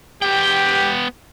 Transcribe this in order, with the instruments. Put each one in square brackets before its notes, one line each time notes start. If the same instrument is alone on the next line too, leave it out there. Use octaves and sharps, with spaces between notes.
[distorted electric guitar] B3 G5 [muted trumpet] G4